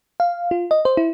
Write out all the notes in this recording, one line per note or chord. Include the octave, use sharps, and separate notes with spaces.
F5
F4
D#5
C5
E4